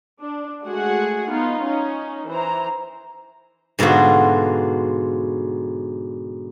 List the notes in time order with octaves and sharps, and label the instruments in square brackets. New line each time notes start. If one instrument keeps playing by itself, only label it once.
[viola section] D4
G#3 A3 F#4 G#4 F#5
B3 D#4 F4
C#4 D#4
E3 C5 A#5
[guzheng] G#2 B2 D3 F4 F#4